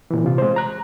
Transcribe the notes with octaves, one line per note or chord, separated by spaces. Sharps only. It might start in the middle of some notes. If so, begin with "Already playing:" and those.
A#2 E3
C3 F4
G#3 C5
A#5 F#6